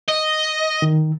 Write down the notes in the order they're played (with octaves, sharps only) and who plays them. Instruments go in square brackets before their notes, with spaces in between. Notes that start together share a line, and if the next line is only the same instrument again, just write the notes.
[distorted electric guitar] D#5
[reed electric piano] D#3